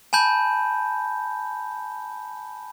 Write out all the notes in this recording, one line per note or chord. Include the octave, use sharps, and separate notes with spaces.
G#5 A5 B5 G6